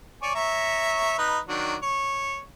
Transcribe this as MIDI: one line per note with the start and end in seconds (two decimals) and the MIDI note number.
0.22 0.30 73
0.22 0.30 74
0.22 0.30 80
0.35 1.17 73
0.35 1.17 76
0.35 1.17 82
1.18 1.38 63
1.18 1.38 71
1.48 1.75 51
1.48 1.75 54
1.48 1.75 62
1.82 2.41 73